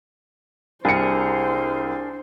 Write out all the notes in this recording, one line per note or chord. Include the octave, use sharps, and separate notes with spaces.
C2 D4 G#4 A#4 C5 C#7